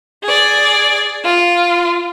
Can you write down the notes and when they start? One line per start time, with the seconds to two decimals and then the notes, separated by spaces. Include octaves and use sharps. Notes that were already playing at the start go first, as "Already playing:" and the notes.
0.24 G#4 D5
1.24 F4